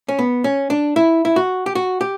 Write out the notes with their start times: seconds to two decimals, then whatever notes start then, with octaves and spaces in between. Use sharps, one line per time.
0.08 C#4
0.19 B3
0.44 C#4
0.70 D4
0.96 E4
1.25 E4
1.36 F#4
1.66 G4
1.75 F#4
2.01 G4